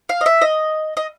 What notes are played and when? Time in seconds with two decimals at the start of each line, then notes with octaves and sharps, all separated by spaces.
0.09 F5
0.21 D#5
0.26 E5
0.42 D#5
0.97 D#5